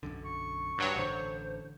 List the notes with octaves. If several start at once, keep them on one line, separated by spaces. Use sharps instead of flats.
B1 F#2 D3
C#6
G2 F#3 C#5
A1 D3 C5